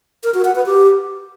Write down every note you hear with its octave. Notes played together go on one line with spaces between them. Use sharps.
A#4
F#4
F#5
B4
G4